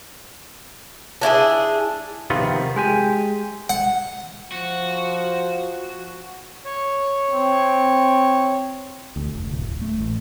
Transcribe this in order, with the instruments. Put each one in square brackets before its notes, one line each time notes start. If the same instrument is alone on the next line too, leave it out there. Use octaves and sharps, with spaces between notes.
[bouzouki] D4 E4 F#4 G#4
[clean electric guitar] C3 D#3 F3 B3 C4 F4
G#3 G4 G#5
[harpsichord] F#5
[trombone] F3 [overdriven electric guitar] F#4
[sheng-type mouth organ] C#5
[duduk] C4
[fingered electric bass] D2
F1
D1
D1
A3
A1